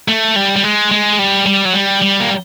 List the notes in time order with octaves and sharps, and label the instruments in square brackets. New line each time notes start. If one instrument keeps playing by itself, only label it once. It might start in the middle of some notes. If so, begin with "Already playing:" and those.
[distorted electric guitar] A3
G3
G3
G#3
G#3
G3
G3
F#3
G3
G3
A#3